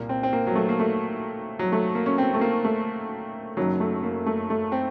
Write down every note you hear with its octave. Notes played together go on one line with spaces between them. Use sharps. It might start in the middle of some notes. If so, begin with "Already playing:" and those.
Already playing: C2 A#2 A#3
C4
C4
A#3
F#3
A3
A#3
A3
F#3
A3
A#3
C#4
C4
A3
A#3
A3
F#1 F#2 D#3 F#3
A3
A#3
A3
A3
C4